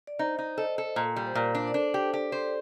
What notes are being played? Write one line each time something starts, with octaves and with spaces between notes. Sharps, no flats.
D5
D#4 C5 D#5
D#4
A4 C5 D#5
A4
A#2
G3
C5
A#2 A#4 D5
D4
D5
D4 A4 C5
G4
G4
C5